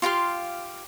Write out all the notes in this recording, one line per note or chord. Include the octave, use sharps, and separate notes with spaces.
F4 G4 F5 C6